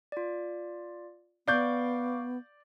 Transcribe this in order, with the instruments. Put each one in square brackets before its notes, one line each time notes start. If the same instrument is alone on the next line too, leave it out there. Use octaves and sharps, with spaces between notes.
[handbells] F4 D5
[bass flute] B3 [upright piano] D5 G6 [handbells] F5 C#6 D6